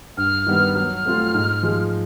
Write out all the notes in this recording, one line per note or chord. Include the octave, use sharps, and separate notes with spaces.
G2 F6
D#3 G3 B3
F#3 F6
A3 C4 F4
G#2
F3 G#3